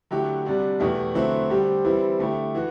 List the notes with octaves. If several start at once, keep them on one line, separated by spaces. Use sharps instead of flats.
D3 F#3 A3 E4 G4
C3 G3 D4 F#4
E2 B2 A3 E4 G4
D3 F#3 A3 C4 E4
D3 G3 C4 G4
E3 G3 C4 E4
D3 A3 E4 G4
E3 F#4